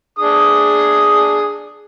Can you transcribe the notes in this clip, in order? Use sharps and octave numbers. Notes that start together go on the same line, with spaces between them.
D4 G#4 D#6